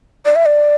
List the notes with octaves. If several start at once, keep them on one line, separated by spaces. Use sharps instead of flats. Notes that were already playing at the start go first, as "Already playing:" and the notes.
D5
E5
D5